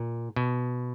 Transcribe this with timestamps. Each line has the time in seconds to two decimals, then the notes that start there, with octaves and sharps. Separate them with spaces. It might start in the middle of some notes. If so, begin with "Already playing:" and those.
Already playing: A#2
0.36 B2